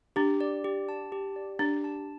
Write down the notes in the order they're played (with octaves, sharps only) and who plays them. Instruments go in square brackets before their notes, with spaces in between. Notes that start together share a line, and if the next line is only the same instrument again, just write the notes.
[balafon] D4 [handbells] G4
[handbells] D5
G4
A5
G4
D5
[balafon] D4 [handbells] G4
[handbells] A5